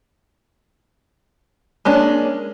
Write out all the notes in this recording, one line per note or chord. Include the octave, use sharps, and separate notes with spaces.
G#3 A#3 C#4 D4